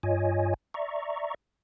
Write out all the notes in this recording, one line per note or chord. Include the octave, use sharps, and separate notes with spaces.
G2 F4 C#5 D#5 G#5
D5 E5 A#5 C#6